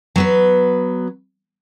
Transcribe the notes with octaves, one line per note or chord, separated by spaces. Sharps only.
F#3 B3 B4